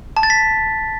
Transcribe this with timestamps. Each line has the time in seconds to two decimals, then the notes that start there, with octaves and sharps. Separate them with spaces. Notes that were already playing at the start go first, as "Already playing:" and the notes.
0.17 A5
0.23 A6
0.30 B6